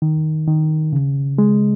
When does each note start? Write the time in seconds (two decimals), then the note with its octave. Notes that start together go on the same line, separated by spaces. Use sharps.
0.02 D#3
0.47 D#3
0.93 C#3
1.38 G#3